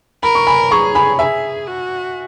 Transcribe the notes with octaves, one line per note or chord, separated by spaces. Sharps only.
A#4 B5
C#6
G#5 B5
G#4 A#5 C#6
G#5 B5
G#4 E5 G#5
F#4